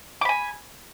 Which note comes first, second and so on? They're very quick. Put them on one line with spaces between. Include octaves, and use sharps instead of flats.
D6 B5 G#5